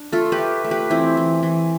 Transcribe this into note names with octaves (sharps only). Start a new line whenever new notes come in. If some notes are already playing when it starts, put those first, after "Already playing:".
Already playing: D4
A3 F4 A4
G4 B4
A3
A3
G4 B4
E3 C4 E4
E3
E3